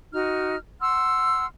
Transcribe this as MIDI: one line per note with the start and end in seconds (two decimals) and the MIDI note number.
0.13 0.57 63
0.13 0.57 66
0.13 0.57 89
0.82 1.46 78
0.82 1.46 84
0.82 1.46 88
0.82 1.46 89